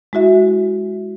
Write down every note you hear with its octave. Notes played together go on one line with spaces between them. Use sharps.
G#3 E4 F#4 E5